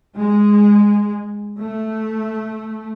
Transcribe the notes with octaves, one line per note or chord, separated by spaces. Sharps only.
G#3
A3